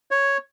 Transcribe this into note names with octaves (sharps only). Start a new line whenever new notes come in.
C#5